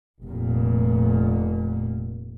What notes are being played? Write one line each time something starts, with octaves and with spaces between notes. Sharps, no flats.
F1 A#2